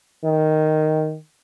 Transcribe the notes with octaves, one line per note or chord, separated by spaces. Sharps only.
D#3